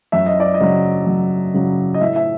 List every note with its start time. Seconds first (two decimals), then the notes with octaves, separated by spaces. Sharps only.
0.12 F#2 E5
0.26 D#5
0.40 D5
0.54 D#5
0.60 C#3 F#3
1.07 F#2
1.54 C#3 F#3
1.94 D#5
2.01 A2 E5
2.16 E5